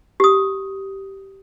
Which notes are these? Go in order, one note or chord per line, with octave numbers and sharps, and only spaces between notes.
G4 D#6